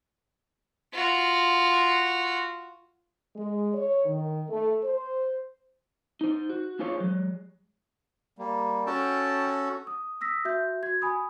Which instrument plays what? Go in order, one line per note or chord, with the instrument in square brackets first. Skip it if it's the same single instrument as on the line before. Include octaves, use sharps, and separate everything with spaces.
[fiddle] F4 F#4
[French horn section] G#3
C#5
D#3
A3
C5
[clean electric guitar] D#4 C5
F#4
A#3 D4 F4 G#4 C5 C#5
F#3 G#3
[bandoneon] G3 A#3
[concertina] C#4 F#4 A4 [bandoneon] G5 A5
[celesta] D#6
D#6 E6 A#6 B6
F#4 E5 G6
F#4 G#6
G#5 B5 D#6